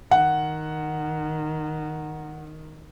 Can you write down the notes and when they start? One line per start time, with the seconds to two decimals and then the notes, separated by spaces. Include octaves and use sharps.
0.11 D#3 F#5